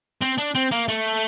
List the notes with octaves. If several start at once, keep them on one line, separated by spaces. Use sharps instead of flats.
C4
D4
C4
A#3
A3